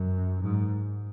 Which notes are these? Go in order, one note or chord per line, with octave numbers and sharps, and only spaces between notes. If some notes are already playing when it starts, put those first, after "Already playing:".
Already playing: F#2
G#2